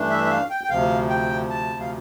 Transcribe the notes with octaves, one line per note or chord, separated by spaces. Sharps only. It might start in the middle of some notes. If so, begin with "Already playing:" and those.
Already playing: G2 E3 A3 D4
E5
E5
F5
G5
G5
D2 C3 F3 F5
G5
A5
F5